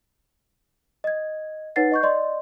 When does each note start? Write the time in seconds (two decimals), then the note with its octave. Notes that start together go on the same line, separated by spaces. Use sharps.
1.04 D#5 G#6
1.76 D#4 B4 C#5 F#5 A6 C7
1.92 D#5 C#6 G6
2.03 D5 D#5 C6